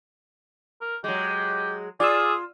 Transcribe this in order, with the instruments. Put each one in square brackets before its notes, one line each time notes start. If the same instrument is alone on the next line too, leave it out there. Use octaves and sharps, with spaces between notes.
[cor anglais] A#4
[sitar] F#3 G#3 [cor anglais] G4
[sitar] F4 [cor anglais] G#4 [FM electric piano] D5 E6